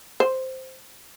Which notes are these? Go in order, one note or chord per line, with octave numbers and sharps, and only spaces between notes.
C5